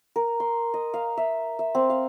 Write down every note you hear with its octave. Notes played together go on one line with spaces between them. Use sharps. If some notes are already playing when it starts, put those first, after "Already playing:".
A#4
C6
D#5
F5
E5
E5
C4
F5